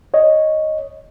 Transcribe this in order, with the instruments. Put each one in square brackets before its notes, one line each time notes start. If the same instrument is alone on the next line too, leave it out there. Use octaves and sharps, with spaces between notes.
[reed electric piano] C#5 D#5